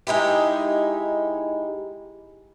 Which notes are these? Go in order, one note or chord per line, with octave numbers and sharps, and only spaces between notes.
G#3 D#4 E4 G4